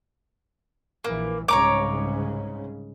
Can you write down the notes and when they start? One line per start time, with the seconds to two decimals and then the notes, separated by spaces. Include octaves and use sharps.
1.04 A#1 E3 A#3
1.48 C2 G#2 C#3 C#5 A#5 D6